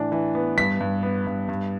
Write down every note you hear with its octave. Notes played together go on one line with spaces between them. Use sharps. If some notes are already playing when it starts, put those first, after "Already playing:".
Already playing: A2 E3 D4
E3
B3
G2 B6
G2
B3
G2
G2